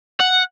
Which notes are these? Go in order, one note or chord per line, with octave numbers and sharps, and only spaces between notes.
F#5